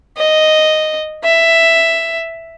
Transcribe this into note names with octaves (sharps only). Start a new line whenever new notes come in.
D#5
E5